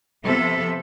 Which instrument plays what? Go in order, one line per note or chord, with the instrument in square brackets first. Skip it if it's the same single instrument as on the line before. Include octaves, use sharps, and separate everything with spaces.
[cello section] C3 F3 B3 A4 E5